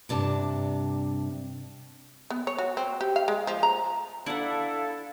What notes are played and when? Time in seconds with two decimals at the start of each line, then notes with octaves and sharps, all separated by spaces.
0.09 G2 C3 D4 A5
2.30 B3
2.47 C#5
2.58 F#4
2.77 C4
3.01 G4
3.16 F5
3.28 G#3
3.47 F3
3.63 A#5
4.26 D4 E4 A4 F5 F#5